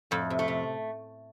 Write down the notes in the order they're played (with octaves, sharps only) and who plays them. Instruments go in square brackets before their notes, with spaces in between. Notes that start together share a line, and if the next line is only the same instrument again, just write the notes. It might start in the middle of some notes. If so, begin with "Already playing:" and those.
[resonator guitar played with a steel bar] F2 [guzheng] A2
[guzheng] C3
[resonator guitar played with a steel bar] A3
[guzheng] C3